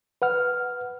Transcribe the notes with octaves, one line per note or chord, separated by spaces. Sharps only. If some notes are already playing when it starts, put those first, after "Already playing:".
B4 F#5 F6